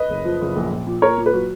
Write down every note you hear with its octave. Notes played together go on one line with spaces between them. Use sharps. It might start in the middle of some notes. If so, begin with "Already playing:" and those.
Already playing: B4 D#5
F#1
F3
F#1
A#1
A#1
A#2
A#2 A#4 C#5
A#2
B4
F#3